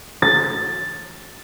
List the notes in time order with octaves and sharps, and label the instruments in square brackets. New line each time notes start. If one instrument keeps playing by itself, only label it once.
[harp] A6